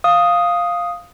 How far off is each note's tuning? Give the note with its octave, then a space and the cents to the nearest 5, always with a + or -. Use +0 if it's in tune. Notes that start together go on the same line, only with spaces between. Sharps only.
F5 +0 D#6 +0